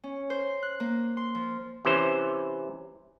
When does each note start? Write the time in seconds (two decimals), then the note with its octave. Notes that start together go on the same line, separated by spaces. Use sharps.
0.04 C#4
0.30 C5
0.63 F#6
0.80 A#3
1.17 C6
1.35 F3
1.85 C3 E3 C#4 C5